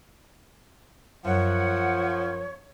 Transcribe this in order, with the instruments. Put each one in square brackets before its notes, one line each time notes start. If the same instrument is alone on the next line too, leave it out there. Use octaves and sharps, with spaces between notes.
[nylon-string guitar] F#2 [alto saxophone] F3 [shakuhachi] C#5 [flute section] F#5